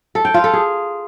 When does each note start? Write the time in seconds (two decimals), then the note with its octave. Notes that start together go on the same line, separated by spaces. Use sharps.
0.15 A4
0.25 G5
0.34 F4
0.44 A4
0.53 G#4